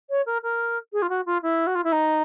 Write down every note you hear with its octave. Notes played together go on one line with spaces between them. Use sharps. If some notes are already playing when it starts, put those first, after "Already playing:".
C#5
A#4
A#4
G#4
F4
F#4
F4
E4
F#4
F4
E4
D#4